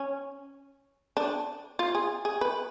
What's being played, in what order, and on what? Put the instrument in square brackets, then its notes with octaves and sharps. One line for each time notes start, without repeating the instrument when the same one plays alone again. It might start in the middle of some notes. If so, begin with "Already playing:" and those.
Already playing: [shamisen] C#4
D4
F4
G#4
G#4
B4